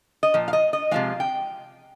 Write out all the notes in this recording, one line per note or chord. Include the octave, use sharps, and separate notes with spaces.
D#5
A#2 F3
F5
D#5
D#5
C3 F3 G#3 F5
G5